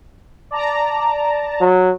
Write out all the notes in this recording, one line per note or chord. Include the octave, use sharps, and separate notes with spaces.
D5 A5 A#5
F#3